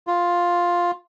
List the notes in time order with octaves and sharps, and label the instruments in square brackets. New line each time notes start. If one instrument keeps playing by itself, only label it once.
[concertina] F4